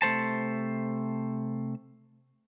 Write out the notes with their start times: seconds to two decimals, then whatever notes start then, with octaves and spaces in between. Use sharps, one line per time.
0.02 C3 A3 C5 A5